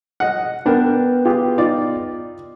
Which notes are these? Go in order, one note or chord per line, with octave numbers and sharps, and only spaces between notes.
D#5 F#5
B3 D4 A#4 B4 G5
F4 G4 G#4
D#4 F4 D5